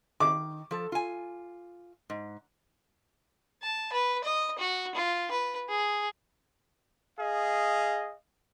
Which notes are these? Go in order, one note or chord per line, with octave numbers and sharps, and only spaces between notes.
D#3 D6
F3 A4
F4 G#5
G#2
A5
B4
D#5
F#4
F4
B4
G#4
G#4 D#5 F5